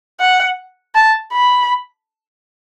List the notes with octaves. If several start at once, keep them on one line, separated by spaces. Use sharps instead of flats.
F#5
A5
B5